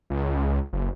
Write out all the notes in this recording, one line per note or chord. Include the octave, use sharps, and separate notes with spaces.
C#2
F#1